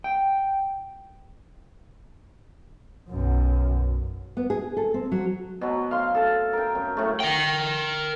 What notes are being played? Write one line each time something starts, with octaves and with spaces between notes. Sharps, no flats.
G5
B1 F#2
B3
G#4
A4
C4
F#3
B2 F#3
F5 C6
A4 A5
A#4 G5
F#2
A2 A3
A#4 G5